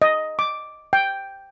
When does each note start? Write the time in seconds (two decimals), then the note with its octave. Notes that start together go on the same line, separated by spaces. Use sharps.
0.02 D#5
0.39 D6
0.93 G5